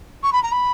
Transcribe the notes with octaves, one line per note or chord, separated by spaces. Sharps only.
C#6
B5
A#5
B5